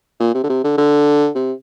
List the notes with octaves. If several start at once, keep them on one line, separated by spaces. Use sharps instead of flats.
A#2
C3
D3
C3
D3
D3
C3